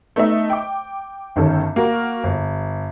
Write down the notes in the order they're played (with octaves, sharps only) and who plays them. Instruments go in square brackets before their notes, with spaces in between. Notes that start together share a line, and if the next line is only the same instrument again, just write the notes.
[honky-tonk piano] A3 B3 D#4 D#5 E5
G5 D6
G1 D#3 C#4 A4
A#3 F#4 A#4
G1